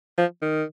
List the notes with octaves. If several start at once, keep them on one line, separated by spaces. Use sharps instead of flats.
F3
D#3